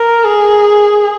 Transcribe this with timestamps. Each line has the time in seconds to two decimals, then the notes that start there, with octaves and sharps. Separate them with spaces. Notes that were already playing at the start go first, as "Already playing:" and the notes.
Already playing: A#4
0.25 G#4